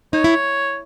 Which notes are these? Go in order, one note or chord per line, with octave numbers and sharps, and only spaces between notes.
D#4 C#5
E4